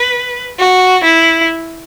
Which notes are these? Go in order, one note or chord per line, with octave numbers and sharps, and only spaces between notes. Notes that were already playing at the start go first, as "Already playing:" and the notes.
Already playing: B4
F#4
E4